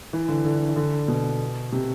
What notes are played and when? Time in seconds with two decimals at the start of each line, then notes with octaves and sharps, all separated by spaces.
0.13 E3
0.29 D3
0.45 D3
0.69 E3
0.76 D3
1.08 B2
1.72 C3